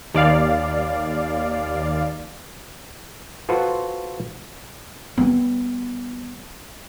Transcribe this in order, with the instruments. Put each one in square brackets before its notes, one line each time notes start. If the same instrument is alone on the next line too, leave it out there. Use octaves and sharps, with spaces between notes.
[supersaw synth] D#2 D5 F5
[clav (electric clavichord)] F4 F#4 A4 B4 C5 F#5
[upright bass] G3 B3